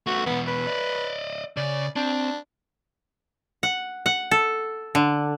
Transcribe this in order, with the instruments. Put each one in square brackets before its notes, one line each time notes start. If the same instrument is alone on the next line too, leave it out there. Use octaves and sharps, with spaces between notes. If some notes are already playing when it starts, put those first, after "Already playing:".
[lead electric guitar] A3 B3 [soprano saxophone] F#4
[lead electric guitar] E2 B2 [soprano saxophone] B3
[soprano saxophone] B4
[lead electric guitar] D5 D#5
[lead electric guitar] C#3 [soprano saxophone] D5
[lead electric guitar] C4 [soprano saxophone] D4
[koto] F#5
F#5
A4
D3